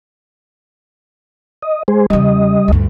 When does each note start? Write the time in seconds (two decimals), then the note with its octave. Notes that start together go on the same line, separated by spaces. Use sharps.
1.62 D#5
1.88 G#3 G#4 C5
2.10 E2 C#3 G3 D#5
2.68 D2 G2